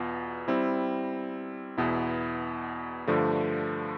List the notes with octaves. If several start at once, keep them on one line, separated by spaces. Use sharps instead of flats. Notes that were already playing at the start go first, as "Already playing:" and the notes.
Already playing: E2 B2 B3 F4
G3 C4 E4
E2 B2 B3 E4
G2 D3 F3 A3